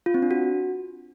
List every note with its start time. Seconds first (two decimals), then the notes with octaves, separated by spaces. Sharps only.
0.06 F4
0.14 C4
0.22 D4
0.31 F#4